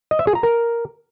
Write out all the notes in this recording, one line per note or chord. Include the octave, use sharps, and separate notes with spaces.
D#5
E5
G#4
A#5
A#4